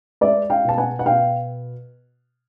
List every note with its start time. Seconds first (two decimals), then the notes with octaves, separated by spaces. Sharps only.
0.21 G#3 D5 E5
0.50 F5 G5
0.64 B2 A5
0.78 F#5 G#5
0.99 F#5
1.06 B2 F5 G5